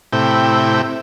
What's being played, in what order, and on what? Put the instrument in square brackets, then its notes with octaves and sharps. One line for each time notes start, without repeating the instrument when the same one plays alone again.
[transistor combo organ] A2 C3 E4 G5